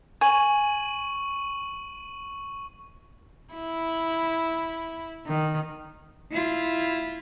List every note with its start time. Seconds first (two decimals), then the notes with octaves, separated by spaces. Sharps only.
0.21 G#5 C#6 D#7 F#7
3.53 E4
5.26 D#3
6.32 E4 F4